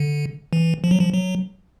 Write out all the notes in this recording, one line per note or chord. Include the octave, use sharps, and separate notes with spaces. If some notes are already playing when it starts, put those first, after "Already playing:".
Already playing: D3
E3
F3
F#3
F3
F#3